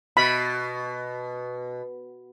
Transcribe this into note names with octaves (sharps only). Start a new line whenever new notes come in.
B2 B5